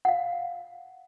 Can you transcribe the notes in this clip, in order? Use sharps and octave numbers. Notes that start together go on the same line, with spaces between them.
F5 F#5